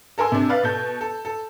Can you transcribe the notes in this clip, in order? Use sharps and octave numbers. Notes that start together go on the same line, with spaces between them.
A4 A#4 G#5 C6 E6
C3 D4
B4 D5 F5 A6
B2 A4 G6
A4
A4